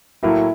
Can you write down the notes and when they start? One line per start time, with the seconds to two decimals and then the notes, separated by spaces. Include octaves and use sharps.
0.23 A2 F#3 A#3 E4